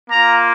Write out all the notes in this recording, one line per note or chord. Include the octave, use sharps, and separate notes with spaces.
A#3 F4 A#5